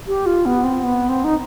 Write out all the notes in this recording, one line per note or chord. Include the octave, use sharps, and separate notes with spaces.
G4
F4
B3
C4
B3
C4
D#4